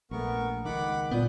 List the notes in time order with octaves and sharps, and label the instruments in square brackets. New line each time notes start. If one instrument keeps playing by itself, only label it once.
[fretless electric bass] A#1 A3 [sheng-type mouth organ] B3 A#4 C#6
[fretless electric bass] C#2 D#3 [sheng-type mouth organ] F#5 B5 D6
[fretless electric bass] G1 [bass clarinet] A#2 [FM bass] B3 [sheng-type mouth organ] B4 D#6 G6